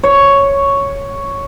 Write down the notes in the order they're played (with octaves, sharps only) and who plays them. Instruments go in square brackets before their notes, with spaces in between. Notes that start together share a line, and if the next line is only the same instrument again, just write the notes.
[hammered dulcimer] C#5